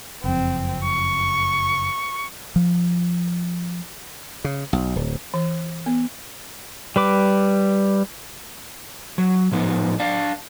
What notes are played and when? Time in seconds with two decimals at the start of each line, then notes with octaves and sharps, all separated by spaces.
0.24 F#1 F2 C4
0.84 C#6
2.56 F3
4.44 C#3
4.73 B1
4.96 D1
5.34 E3
5.86 B3
6.96 G3 B4 D6
9.18 F#3
9.52 A2 F3 B3 D#4
10.00 D4 D5 F5